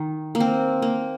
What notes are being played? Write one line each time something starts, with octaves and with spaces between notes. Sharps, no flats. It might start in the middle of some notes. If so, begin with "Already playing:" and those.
Already playing: D#3
A#3
C4
A#3